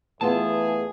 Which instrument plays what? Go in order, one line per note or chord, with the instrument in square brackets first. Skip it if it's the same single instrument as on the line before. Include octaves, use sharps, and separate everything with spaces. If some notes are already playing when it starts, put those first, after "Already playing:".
[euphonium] E2 [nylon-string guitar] A3 B3 F4 [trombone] G#4 [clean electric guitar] A5